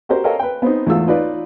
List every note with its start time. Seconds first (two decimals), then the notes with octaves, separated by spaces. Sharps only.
0.09 F#4 G4 A#4 C5
0.24 A4 A#4 C#5 D#5 F5 G5
0.39 B4 G5
0.62 B3 C4 D#4
0.86 E2 G#2 A3 F4 E6
1.08 D#4 F4 B4 C#5 D5